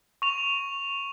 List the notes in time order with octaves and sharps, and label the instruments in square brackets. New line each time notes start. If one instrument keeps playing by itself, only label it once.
[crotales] C#6 F7